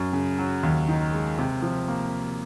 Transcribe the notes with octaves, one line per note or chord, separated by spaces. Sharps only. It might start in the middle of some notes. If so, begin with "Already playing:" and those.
Already playing: F#2
C#3
F#3
D#2
D#3
G#3
C3
F3
A#3